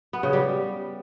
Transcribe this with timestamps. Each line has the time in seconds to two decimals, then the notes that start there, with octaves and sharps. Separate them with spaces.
0.13 B3
0.23 C#3
0.33 G3